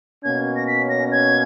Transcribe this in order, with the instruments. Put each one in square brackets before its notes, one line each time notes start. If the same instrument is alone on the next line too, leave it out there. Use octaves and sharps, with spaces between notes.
[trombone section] B2 A#3 C#4 [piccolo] G#6
[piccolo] A#6
B6
A#6
G#6